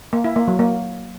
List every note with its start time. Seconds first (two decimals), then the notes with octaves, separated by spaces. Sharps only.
0.13 A#3
0.24 E4
0.36 A#3
0.48 F#3
0.59 A#3